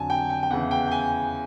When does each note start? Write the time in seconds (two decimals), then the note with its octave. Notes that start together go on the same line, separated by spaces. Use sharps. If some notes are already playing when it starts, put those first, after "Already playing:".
Already playing: F2 D3 F#3 G#5 A5
0.10 G5
0.30 G5
0.43 G5
0.50 E2 C#3 E3 F#5
0.71 G5
0.87 G5
0.91 G#5